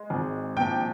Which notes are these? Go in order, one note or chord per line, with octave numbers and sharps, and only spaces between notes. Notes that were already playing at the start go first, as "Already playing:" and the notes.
Already playing: G#3
G#1
A#1 G5